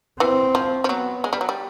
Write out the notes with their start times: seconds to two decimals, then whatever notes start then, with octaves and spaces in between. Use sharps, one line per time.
0.20 E3 C4
0.55 F3
0.84 F3
0.89 F#3 B3
1.24 G#3
1.33 G3
1.41 F#3
1.49 G3